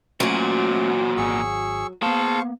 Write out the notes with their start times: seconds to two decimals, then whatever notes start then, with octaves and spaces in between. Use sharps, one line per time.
0.20 E2 A#2 F#3 A3 C#4 F#4 C5
1.17 G#1 G#4 C#6 E6
2.02 A#3 B3 G#4 C5 F5 A5 C#6